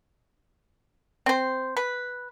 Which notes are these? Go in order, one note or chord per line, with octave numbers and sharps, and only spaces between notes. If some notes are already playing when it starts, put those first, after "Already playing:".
C4 C5
B4